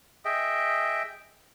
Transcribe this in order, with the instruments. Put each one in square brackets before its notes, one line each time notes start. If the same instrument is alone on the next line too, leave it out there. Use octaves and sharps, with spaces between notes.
[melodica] G#4 D#5 E5 G5